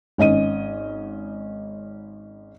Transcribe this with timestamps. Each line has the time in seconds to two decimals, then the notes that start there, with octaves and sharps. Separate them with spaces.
0.18 G#1 C#4 D#5 D#7